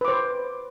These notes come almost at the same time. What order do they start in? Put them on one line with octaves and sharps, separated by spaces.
B4 D6 C5